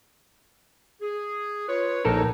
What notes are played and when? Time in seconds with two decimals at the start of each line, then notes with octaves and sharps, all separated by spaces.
1.01 G#4
1.69 F4 B4 C#5
2.05 A#1 D#4 A4 A#4